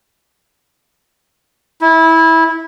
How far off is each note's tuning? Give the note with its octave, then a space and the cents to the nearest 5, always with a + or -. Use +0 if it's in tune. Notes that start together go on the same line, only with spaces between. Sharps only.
E4 -20